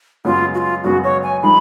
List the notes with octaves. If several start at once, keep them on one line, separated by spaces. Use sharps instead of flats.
F#2 C#3 G#3 B3 F4
F#4
F4
F#2 C#3 G#3 B3 F#4
C#5
G#5
F3 G#3 D#4 B5